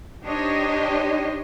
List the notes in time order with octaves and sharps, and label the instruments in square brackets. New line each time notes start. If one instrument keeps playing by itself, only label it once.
[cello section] D4 D#4 G4 C5 C#5 D#5